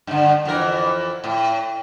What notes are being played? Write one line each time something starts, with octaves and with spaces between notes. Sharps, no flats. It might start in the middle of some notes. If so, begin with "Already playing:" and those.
G2 D3
F2 E3 A#4
A2